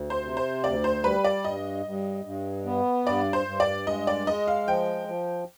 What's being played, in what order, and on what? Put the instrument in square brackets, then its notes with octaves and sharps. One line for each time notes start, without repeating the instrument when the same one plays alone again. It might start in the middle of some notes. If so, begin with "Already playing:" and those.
Already playing: [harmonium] D2
[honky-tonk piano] C5
[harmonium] C3
[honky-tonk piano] C5
[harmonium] D2 [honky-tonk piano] D5
[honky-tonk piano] C5
[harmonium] G3 [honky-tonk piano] B4
[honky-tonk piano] D5
[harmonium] G2 [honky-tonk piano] D#5
[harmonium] G2
G2
B3
[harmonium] G2 [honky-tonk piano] D5
[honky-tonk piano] C5
[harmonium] G2
[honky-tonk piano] D5
[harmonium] G#3 [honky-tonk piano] D#5
[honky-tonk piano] D5
[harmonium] G#3 [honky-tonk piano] D#5
[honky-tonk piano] F5
[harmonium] F3 [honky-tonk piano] G5
[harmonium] F3